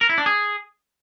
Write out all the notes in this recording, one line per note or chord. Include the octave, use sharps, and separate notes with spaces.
A#4
E4
D4
G#4